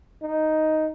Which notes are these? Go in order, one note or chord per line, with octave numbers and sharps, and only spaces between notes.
D#4